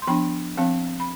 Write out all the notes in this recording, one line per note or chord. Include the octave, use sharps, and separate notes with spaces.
C6
F3 B3 D4 G5 B5
F3 C4 F5 A5
B5